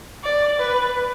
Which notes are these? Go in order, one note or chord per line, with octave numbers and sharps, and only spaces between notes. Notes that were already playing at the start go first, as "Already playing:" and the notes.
D5
B4